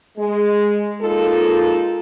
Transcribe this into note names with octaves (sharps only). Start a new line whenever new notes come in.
G#3
G#3 A#3 D#4 F4 A4